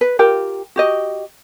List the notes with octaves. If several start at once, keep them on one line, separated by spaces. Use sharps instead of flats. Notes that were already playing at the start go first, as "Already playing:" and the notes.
B4
F4 G4 A#4 G5
F#4 G4 D#5